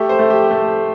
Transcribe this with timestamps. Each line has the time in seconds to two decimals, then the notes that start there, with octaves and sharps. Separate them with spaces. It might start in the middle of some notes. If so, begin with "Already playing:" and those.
Already playing: A3 G4
0.09 C5
0.19 A3
0.30 G4
0.51 A3